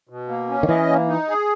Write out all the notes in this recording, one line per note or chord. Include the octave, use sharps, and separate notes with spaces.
B2
A#3
C#4
D#3
E3 D#5
A#3
D#4
G#4